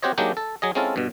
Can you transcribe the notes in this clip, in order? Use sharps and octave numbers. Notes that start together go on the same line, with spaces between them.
C4 F#4 G4 C5 C#5 D#5
F#3 G#3 A#3 D4 D#4 G4
A4
F#3 G#4 D#5
G#3 C4 C#4 E4 F4 A4
G2 B2